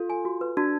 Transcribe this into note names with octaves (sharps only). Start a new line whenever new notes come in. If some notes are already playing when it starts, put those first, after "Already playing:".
Already playing: F4 A4
G#5
F#4
B4
D4 F#4